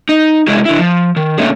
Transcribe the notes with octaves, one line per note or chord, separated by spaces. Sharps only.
D#4
C3 G#3 E4 G#4
D3 E4
F3
D#3
A#2 D3 A3 A#3 C#4 G#4